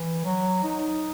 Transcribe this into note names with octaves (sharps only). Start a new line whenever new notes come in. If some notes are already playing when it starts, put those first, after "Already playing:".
Already playing: E3
F#3
D#4